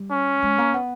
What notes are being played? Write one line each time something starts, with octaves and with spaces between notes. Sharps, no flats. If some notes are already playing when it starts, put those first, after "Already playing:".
Already playing: G3
C#4
G#3
A#3
B3